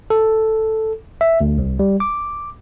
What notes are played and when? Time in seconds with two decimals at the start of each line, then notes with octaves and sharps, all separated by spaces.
0.10 A4
1.21 E5
1.41 D2
1.58 C2
1.79 G3
2.00 D6